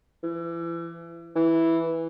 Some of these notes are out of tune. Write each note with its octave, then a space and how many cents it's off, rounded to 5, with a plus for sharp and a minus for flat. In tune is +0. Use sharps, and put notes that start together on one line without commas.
E3 +35
E3 -5